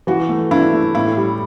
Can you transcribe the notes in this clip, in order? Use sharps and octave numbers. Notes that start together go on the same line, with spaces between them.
E3 F#4
A3
D4 E4
A3
A2 E4
G3